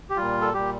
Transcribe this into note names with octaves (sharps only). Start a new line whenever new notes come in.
G4
A#2 G3 F4
A4
A#2 G3 G4